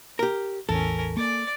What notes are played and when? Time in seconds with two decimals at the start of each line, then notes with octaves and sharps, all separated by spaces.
0.19 G4 A#4
0.69 A1 E2 C#4 A4 A#4
1.17 A#3 D5 D6